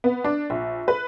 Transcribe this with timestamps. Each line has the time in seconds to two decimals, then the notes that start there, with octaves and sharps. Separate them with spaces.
0.04 B3
0.24 D4
0.50 A#1
0.88 B4